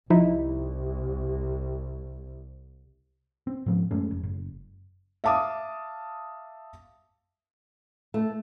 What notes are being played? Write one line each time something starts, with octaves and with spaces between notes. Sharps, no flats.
C2 F3 D#4 E4
C4
G#2 F3
F#2 G#3 A3 C#4
F1
F#1
E5 F5 A5 D6 D#6
A3